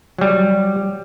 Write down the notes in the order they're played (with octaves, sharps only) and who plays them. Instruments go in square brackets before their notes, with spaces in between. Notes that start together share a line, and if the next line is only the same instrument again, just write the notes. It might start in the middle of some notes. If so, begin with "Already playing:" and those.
[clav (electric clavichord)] F#3 G3